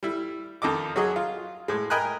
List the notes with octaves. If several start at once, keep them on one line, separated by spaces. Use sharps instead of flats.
G3 E4
F2 D#3 A4 D#5 D6
F#3 F#4 G#4 D#5
F4
A2 G#3
A#4 D#5 G5 G#5 B5 F#6